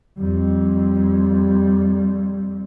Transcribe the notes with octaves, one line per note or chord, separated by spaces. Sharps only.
F2 G3